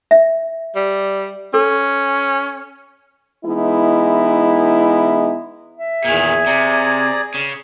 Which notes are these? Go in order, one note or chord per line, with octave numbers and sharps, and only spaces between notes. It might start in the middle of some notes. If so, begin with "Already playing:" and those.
E5
G3
C#4 A4
E3 G#3 B3 D#4 E4
E5
E2 A#2 D#3 G#4
C3 D5 A#5
C#3